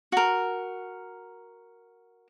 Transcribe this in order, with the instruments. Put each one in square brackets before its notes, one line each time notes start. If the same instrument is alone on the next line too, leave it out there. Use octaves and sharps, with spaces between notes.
[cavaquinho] F#4 A#4